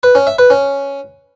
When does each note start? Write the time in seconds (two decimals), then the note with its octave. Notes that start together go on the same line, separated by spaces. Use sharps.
0.03 B4
0.15 C#4
0.27 E5
0.39 B4
0.50 C#4